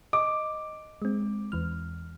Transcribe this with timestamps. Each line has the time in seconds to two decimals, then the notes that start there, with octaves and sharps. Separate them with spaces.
0.13 D#5 D6
1.02 G#3 C4
1.52 E2 E3 F6